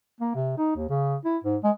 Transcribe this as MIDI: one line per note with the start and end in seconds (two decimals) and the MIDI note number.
0.21 0.32 58
0.35 0.56 48
0.57 0.74 63
0.76 0.88 39
0.89 1.15 49
1.25 1.38 64
1.44 1.57 44
1.64 1.71 56